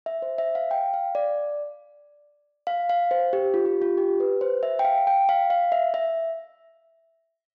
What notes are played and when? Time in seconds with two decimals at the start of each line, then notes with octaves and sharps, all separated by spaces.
0.06 E5
0.22 C5
0.38 E5
0.55 F5
0.71 G5
0.94 F5
1.15 D5
2.67 F5
2.90 F5
3.11 C5
3.33 G4
3.54 F4
3.65 G4
3.82 F4
3.98 G4
4.20 B4
4.41 C5
4.63 E5
4.79 G5
4.85 F5
5.07 G5
5.29 F5
5.50 F5
5.72 E5
5.94 E5